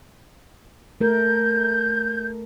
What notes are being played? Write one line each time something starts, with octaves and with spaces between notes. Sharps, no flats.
A3 A#4 G6